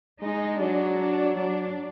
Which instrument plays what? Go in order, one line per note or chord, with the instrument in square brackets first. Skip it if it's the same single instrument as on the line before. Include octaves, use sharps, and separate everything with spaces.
[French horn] G#3 [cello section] D#4
[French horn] F#3 [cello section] D4
[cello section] D4
[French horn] F#3 [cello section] D4